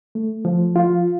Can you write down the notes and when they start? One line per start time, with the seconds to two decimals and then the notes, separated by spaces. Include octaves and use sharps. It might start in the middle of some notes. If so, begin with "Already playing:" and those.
0.15 A3
0.45 F3
0.76 F4